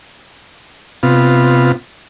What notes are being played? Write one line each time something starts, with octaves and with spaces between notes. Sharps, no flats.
C3 B3 F4